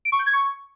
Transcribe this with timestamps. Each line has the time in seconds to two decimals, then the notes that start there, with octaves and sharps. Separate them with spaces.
0.05 D7
0.12 C#6
0.19 G6
0.26 G#6
0.33 C#6